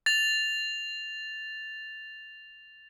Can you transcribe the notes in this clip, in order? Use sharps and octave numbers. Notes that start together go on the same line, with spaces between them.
A6 F7